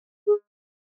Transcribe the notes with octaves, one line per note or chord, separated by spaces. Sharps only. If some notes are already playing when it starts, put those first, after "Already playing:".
G#4